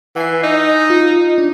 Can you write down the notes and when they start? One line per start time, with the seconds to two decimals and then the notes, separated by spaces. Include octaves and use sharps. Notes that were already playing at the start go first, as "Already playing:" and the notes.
0.16 E3 F#5 G#5 C7
0.43 D#4 E6
0.90 F4
1.38 D4